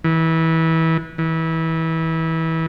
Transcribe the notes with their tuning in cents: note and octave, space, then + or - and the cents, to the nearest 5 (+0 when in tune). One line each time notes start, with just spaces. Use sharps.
E3 -25
E3 -25